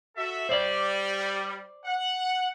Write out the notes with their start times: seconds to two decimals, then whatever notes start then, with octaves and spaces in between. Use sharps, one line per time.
0.16 F#4 A4 E5
0.49 G3 C5 D5
1.85 F#5